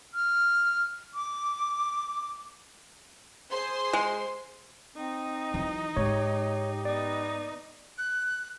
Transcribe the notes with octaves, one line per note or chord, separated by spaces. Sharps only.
F6
D6
G#4 C5 C6
G#3
C4 D#4
E3 F#3
G#2 G4 C#5
B3 D#4 D5
F#6